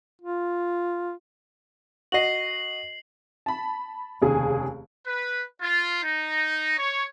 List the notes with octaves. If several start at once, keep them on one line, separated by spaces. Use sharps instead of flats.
F4
F#4 D#5 C7 F#7
A5 B5
F1 D#2 C#3 G#4 G#5
B4
F4
D#4
C#5